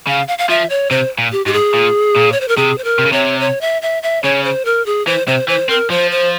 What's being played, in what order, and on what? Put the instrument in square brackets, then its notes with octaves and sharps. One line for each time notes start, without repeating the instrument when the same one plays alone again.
[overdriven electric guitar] C#3 [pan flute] F5
[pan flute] F5
F5
[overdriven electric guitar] F3 [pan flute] E5
[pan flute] C#5
[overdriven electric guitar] C3 [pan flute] C5
[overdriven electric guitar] A#2
[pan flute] G4
[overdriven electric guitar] G#2 [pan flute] G4
[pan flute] G#4
[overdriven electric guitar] A#2
A#2
[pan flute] C#5
C5
A#4
[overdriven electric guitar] C3 [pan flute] G#4
[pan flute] C5
A#4
[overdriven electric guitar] C3
C#3
[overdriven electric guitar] C3 [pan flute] C#5
[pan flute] C#5
E5
E5
E5
[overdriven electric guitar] C#3 [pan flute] C#5
[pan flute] C5
A#4
G#4
[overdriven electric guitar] E3 [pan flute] C5
[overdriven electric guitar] C3 [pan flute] C5
[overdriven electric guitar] E3 [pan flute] C5
[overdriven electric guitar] C4 [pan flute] A#4
[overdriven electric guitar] F3 [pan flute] C5
[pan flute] C5